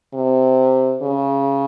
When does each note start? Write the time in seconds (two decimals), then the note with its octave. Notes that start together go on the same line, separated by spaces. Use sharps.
0.14 C3
1.02 C#3